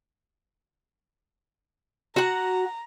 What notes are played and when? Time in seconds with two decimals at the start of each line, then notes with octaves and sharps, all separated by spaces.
2.16 F#4 F#5 A#5